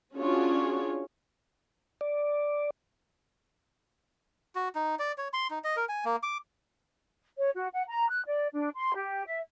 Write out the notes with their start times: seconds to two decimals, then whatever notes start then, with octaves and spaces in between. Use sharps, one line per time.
0.17 C#4 D4 F4 F#4 G#4 C#5
2.01 D5
4.55 F#4
4.75 D#4
4.99 D5
5.18 C#5
5.33 C6
5.51 D#4
5.64 D#5
5.77 A#4
5.89 G#5
6.05 A#3
6.23 D6
7.38 C#5
7.55 F#4
7.72 F#5
7.88 A#5
8.09 F#6
8.26 D5
8.53 D4
8.74 C6
8.95 G4
9.25 E5